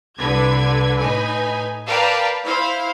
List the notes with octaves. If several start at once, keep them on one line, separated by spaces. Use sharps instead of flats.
C2 D3 B4 G#6
A2 D#4 B4 G#5
A#4 B4 D5 F5 G5 A5
E4 C5 F5